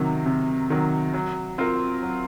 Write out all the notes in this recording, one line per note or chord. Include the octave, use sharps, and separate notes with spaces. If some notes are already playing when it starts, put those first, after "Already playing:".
Already playing: C3 D#3 F#3
C3
D#3 F#3
F#3
C4 F4 A#4
F#3